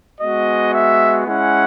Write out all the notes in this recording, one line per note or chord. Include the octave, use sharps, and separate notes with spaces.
G#3 B3 F#4 D#5
E5
G#3 C#4 E4 F#5